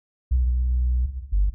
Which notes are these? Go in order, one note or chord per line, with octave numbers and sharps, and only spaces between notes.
B1
G1